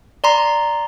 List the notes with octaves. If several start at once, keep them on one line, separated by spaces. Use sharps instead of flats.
D5 A#5 C6